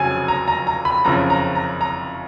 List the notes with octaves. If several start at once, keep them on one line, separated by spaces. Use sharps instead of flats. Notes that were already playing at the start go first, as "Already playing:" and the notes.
Already playing: F1 F2 C#3 F#3 G#5
A#5
A#5
A#5
B5
F#1 F2 C#3 A#5
A#5
A#5
A#5